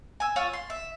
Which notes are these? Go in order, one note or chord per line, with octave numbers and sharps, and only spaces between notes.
G#5 E6
F4 C#5 E6
C6
E5